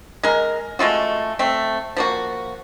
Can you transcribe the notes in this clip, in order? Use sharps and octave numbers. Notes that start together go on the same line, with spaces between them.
G#3 A#4
G#3 A3 F4 F#4
A3 C4
F3 A#3 F#4